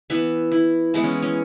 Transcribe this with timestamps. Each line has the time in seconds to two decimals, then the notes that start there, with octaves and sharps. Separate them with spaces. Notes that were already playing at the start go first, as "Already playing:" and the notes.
0.10 E3 B3 E5
0.52 E4
0.94 E3 G#3 B3 E4
1.04 C#4
1.23 C#4